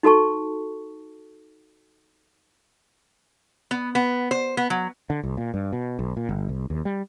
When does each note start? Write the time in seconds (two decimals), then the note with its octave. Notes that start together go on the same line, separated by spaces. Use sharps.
0.03 D#4 F#4 A4 A5 C#6
3.71 B3
3.95 B3
4.31 C5
4.57 B3
4.70 F#3
5.10 D3
5.23 C2
5.37 A#2
5.54 G2
5.72 B2
5.99 B1
6.17 A#2
6.29 G1
6.49 C2
6.70 D#2
6.85 G3